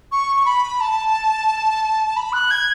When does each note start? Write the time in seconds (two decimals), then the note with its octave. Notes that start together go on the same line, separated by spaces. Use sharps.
0.12 C#6
0.36 C#6
0.45 B5
0.81 A5
2.16 B5
2.33 F#6
2.51 G#6